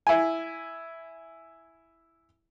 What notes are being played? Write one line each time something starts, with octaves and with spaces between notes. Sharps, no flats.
E4 G#5